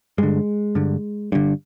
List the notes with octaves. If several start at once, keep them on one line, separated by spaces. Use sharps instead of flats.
G2 D3 G#3
G2 D3
G2 D3